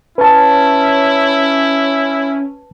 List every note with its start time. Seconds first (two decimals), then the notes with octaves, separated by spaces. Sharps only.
0.18 C#4 E4 B4 A5